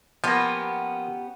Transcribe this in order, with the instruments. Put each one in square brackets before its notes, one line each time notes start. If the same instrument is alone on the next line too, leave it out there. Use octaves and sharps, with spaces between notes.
[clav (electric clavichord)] F3 A#3 [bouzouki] B3 C#4 G4